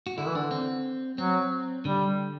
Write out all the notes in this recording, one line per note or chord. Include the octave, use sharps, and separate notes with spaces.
F#4
D3 E4
E3
D3 D4
C4
F#3 C4
D3 G3